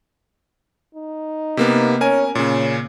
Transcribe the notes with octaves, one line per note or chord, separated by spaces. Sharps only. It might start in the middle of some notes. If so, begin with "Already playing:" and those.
D#4
C3 A#3 B3
C#4 A#4 G#5
A#2 C#3 C#4